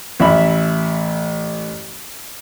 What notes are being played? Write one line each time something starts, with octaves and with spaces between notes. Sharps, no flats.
A1 E5 B5